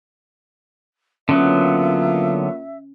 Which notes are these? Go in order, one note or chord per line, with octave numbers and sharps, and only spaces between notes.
D3 F#3 A#3 B3 C#4 F4 E5